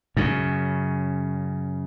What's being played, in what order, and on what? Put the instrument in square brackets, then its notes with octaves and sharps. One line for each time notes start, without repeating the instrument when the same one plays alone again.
[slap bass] F#2 C#3